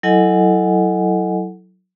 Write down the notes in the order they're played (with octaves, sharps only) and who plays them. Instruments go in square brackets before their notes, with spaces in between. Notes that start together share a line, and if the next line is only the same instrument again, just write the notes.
[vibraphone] F#3 E4 A4 D#5 F#5 G#5